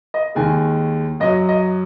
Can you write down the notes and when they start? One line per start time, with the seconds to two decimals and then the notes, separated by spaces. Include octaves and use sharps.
0.14 D#5
0.35 D#2 D#3 G#3 G#5
1.20 F#2 F#3 D#5
1.49 D#5